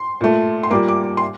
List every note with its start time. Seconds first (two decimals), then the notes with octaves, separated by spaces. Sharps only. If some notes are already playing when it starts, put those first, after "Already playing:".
Already playing: C6
0.21 A#2 A3
0.63 C6
0.70 A#2 G3 A#3 D6
0.88 D6
1.17 C6